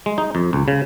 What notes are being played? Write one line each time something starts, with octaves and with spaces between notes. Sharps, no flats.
G#3
D#4
F2
C#2
C#3